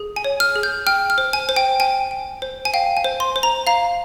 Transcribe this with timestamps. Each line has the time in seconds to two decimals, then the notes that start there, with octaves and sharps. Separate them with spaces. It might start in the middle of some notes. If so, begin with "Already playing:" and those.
Already playing: G#4
0.16 G#5
0.24 C#5
0.40 F6
0.56 G#4
0.63 G6
0.87 G5 F6
1.10 F6
1.18 C5
1.33 G#5
1.49 C5
1.56 G5
1.80 G5 G#5
2.11 G5
2.42 C5
2.65 G#5
2.74 F5 G5
2.97 G#5
3.04 C5
3.20 C6
3.36 C5
3.43 A#5
3.67 F5 A#5